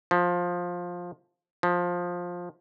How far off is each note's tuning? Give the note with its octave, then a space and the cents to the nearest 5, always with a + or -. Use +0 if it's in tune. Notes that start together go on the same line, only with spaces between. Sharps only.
F3 +15
F3 +15